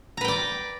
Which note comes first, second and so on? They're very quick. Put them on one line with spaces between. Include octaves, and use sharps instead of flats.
A#5 B4 G5 D5